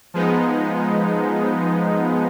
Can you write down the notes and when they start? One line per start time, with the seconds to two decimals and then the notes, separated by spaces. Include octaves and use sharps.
0.14 F3 G#3 B3 D#4